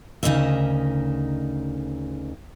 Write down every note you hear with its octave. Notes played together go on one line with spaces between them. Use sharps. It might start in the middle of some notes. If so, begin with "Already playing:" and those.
D2 C#3 D#4 A#4 D#5 E5